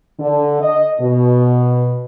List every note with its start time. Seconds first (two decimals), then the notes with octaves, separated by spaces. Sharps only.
0.19 D3
0.61 D#5
1.01 B2